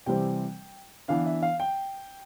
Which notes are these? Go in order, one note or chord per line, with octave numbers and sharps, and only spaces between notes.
C3 E3 G3 C4 G5
E3 B3 D4 F5
E5
F5
G5